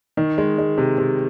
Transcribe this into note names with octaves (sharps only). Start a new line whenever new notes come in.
D#3
G#3
G#3
C3
C3